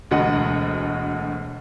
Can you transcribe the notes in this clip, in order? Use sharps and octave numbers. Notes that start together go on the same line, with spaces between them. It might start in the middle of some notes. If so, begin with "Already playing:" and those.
E1 D2 F#4 D#5 F#5